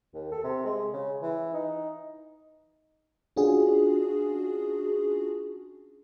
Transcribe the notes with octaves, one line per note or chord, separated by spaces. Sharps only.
D#2
A4
C3
G#3
C#3
E3
D#4
C#4 D4 F4 F#4 G#4